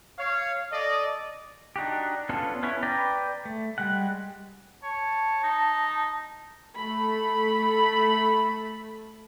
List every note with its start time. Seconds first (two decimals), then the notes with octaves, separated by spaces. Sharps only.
0.18 C#5 F5
0.71 A4 D5 D#5
1.76 D4 D#4 F#4 G4
2.29 B3 C#4 D4 F4 A4
2.63 B3 C#4 E4 C#5
2.83 B4 D5 G5 A#5
3.45 A3
3.78 G3 G#3 F#5
4.83 C#5 A5
5.43 D#4
6.77 A3 A4 B5